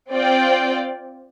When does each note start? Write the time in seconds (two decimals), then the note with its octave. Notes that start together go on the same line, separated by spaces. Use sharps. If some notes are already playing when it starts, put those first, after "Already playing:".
0.12 C4 F4 D5 G5